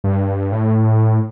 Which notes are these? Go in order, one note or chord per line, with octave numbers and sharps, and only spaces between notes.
G2
A2